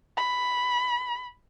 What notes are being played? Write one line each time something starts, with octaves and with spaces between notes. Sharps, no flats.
B5